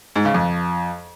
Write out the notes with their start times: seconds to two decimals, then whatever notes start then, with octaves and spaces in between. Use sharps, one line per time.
0.16 G#2
0.25 C#3
0.34 F2